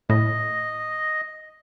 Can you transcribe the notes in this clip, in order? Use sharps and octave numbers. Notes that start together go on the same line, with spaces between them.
A2 D#5